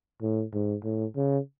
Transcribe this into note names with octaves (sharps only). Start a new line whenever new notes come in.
A2
G#2
A2
C#3